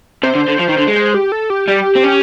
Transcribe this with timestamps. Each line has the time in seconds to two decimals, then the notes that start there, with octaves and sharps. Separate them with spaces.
0.23 C3 C5
0.35 D3
0.48 D3
0.59 F3
0.68 D#3
0.77 D3
0.87 G#3
0.96 C5
1.14 G4
1.32 A4
1.50 G4
1.68 G3 G4
1.96 C4
2.04 C#4